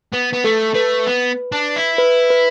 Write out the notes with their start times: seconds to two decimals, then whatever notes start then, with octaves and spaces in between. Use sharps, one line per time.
0.13 B3 B4
0.33 B3
0.44 A3 A4
0.74 A3 B4
1.06 B3
1.52 D4
1.76 E4
1.98 B4
2.30 B4